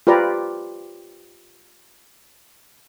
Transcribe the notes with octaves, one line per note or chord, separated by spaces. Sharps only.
F4 G4 B4 D5 A#5